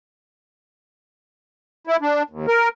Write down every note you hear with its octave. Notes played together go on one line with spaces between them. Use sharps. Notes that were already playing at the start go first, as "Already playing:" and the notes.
E4
D4
D#2
A#4